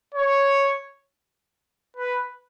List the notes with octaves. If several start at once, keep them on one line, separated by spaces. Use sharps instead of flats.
C#5
B4